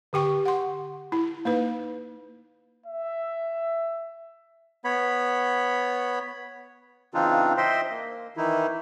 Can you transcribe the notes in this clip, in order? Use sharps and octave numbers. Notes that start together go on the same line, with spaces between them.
D3 G4 G5 C#6
F#5 C6
E4
A#3 D#4 B4
E5
B3 C#5 B5
C#3 E3 C4 D4 D#4 F4
C5 D#5 E5 G5 C6
A#3
D#3 E3 D#4 E4